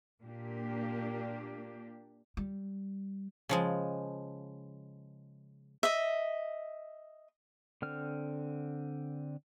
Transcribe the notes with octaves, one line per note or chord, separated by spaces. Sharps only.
A#2 A#3 D4 G4
G3
C#3 F3 G#3
D#5 E5
D3 C4 F6